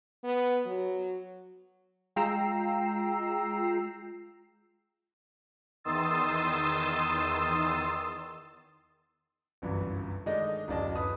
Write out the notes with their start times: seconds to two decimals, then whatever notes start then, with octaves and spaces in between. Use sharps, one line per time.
0.24 B3
0.65 F#3
2.16 G#3 F4 G5 A#5 E6 C7
5.84 E2 D#3 C6 D#6 E6 A6
9.62 G1 C2 F#2 E3
10.26 D#3 G#3 A3 D4 D#4 D#5
10.68 D1 F#2 D4 D#5 A5
10.96 F#2 B4 D#6